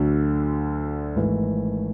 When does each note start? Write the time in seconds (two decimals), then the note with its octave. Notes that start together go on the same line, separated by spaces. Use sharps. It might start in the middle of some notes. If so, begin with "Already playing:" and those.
Already playing: D2 D3 F#3
1.16 G#1 G#2 E3 A3